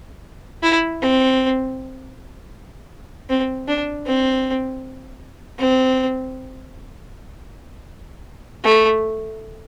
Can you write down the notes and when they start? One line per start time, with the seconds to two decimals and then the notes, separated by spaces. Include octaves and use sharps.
0.63 E4
1.02 C4
3.30 C4
3.68 D4
4.06 C4
5.59 C4
8.64 A3